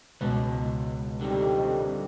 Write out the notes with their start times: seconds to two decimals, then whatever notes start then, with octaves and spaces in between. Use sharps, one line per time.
0.21 C#2 B2 G#3 B4
1.21 F2 D3 D#3 G3 C4